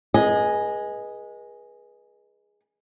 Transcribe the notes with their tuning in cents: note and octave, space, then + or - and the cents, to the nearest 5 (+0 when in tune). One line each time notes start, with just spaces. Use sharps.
G#4 +0 B4 -35 D#5 +0